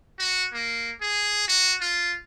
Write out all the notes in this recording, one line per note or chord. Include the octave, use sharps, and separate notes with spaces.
F#4
A#3
G#4
F#4
F4